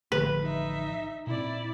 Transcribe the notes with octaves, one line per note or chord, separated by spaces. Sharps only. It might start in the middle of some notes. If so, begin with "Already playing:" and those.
A1 D3 F3 B4
D#4 E5
A#2 C4 E4 D5